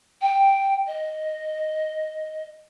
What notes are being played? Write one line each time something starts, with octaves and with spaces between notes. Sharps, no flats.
G5
D#5